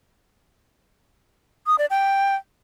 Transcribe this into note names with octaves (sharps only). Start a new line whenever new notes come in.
D#6
D5
G5